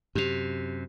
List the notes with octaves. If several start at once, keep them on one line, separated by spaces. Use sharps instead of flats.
F#2 C3 G4 F7